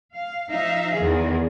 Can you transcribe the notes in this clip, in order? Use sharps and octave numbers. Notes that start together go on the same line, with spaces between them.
F5
F3 D#4 E5 F5
E2 D#3 G#4